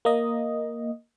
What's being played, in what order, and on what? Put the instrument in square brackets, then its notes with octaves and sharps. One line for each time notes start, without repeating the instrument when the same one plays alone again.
[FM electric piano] A#3 D#5